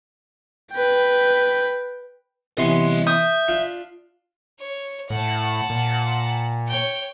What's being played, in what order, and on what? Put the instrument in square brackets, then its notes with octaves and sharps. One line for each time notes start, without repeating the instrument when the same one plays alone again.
[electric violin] B4 G5
[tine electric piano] C3 C7 [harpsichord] E3 B3 C#4 [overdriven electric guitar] D#5 C6
[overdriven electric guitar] E5 [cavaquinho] D#6 [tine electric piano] G6
[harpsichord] D4 F4
[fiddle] C#5
[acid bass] A2 [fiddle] F#5 A5
[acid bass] A#2
[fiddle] C#5 G5